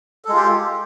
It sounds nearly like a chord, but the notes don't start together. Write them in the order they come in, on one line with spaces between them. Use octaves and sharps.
A4 G#3 F4 G4